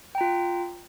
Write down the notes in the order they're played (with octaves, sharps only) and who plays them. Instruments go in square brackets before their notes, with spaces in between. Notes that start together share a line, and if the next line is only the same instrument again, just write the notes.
[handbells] G5
A#5
F4